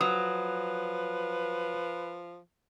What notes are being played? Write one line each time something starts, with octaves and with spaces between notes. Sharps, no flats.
F3 F#3 B4 D#6